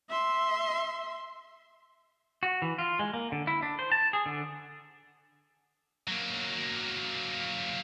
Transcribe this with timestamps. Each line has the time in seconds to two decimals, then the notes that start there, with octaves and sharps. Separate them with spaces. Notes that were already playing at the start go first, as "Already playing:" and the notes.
0.10 E5 C6
2.43 F#4
2.62 E3
2.78 F4
2.99 G#3
3.14 A#3
3.32 D3
3.47 E4
3.63 D4
3.79 C5
3.92 A5
4.13 G#4
4.26 D3
6.08 F#3 A#3